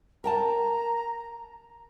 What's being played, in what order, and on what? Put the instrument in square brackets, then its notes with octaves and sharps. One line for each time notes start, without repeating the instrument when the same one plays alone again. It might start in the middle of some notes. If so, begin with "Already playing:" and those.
[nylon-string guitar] A#4 G5 A5 [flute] A#5